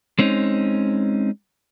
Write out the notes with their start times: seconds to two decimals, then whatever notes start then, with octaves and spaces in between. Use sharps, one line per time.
0.19 G#3 C4 C#4 D#4